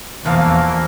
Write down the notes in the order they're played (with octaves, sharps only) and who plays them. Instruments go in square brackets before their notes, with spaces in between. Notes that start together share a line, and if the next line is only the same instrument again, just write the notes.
[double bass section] E2 [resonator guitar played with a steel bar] G2 F3 F5 [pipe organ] E3 A#3